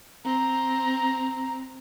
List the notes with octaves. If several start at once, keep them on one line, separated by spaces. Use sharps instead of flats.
C4 A#5